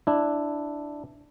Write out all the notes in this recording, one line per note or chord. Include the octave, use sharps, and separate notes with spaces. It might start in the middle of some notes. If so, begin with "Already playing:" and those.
D4 E4